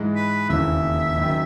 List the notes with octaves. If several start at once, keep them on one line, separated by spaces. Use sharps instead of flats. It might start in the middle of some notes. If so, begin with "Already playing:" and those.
Already playing: G#2 E3 G#3
B4
E1 D#2 C#3 E3 A#3 E5
F#1 F#2 D#3